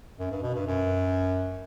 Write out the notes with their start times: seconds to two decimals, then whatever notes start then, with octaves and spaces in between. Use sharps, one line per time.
0.19 F#2
0.31 G2
0.42 B2
0.55 G2
0.66 F#2